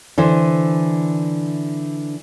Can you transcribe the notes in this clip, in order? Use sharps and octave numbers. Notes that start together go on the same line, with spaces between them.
D3 E3 E4 C5